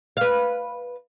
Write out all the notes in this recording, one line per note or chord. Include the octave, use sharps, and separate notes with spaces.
B4 F5